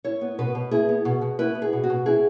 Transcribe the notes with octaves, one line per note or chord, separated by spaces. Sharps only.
E4 C#5
B3
B2 B4
B2
E4 G#4
B3
B2
B2
E4 B4
B3
G#4
B2
F#4
B2
E4 G#4